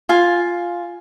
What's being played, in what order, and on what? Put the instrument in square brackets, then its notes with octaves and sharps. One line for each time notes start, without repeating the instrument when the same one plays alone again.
[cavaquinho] F4 F5 G#5